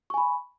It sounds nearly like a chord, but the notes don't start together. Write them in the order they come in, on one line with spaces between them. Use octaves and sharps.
C#6 G#5 B5